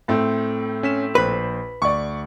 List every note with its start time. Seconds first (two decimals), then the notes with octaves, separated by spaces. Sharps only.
0.08 A2 A3 C4
0.83 C#4 B6 E7
1.15 A#1 B4 C5 B6
1.82 D2 D5 C#6